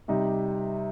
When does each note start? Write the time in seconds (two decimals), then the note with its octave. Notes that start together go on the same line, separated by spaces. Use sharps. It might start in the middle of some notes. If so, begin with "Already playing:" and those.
0.08 C3 G3 D#4 G4